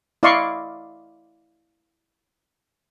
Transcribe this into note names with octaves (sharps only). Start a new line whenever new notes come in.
E4 D5 D#5 F5 C6 C#6